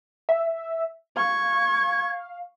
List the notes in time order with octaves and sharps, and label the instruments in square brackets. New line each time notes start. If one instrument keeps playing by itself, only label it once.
[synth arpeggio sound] E5
[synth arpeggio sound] F5 [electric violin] C#6 [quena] G#6